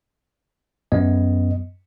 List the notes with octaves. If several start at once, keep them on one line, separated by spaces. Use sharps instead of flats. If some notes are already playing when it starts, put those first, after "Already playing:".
F#2 B3 D#5